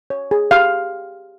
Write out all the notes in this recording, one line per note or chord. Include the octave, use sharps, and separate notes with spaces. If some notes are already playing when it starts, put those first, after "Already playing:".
C#5
G#4
G4 F5